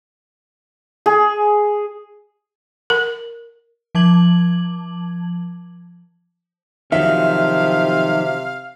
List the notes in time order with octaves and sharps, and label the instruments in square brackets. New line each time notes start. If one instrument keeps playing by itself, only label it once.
[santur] G#4
[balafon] A#4
[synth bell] F3 A5 D6 G#6 F#7
[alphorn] C3 [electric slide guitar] D#3 F3 F#3 [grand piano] E5 [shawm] F5